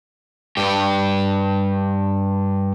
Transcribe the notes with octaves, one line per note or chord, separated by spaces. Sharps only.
G2 G4